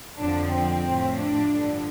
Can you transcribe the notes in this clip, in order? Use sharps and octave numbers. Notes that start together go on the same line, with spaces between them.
F2 D3 F3 D4
C4
A2 F3
D4
G2 D3 F3